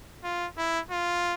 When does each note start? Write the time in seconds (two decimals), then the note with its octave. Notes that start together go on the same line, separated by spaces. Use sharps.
0.24 F4
0.57 E4
0.91 F4